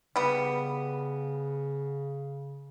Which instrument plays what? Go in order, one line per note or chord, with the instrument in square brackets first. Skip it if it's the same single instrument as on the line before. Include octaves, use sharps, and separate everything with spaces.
[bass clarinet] C#3 [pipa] G3 B3